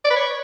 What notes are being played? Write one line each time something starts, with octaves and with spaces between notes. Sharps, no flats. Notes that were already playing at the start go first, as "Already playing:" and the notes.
D5
B4
C#5